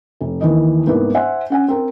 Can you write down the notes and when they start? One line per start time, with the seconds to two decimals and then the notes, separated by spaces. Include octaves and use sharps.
0.21 F1
0.41 D#2 E3 D#5
0.87 C2 G#2 A#3 B3
1.15 C5 E5 F#5 G#5
1.50 C#4 F#5 G#5
1.68 C4 A#4